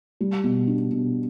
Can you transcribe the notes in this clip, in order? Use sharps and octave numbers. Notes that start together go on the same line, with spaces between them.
G3
B2
D4
B2